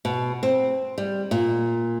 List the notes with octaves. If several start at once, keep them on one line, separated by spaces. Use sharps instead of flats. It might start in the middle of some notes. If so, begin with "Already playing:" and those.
B2
C4
G3
A#2